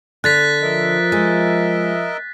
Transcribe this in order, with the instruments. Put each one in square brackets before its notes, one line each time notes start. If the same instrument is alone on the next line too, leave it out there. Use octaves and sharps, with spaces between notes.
[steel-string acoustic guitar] D3 [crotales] F#6 A6 B6
[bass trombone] F3 [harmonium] A#4 D#5 E5
[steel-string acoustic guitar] G#3